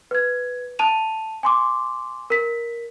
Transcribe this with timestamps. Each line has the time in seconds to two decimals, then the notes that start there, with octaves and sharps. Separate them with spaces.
0.11 B4 G#6
0.79 A5 D#7 F7
1.43 G#5 C6 D6
2.30 A#4 B6